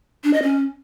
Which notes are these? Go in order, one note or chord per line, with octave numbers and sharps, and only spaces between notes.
D4
D#5
C#4